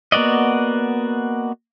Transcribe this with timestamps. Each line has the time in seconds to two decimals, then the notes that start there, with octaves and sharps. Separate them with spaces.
0.12 A#3 B3 F#4 D5 D#5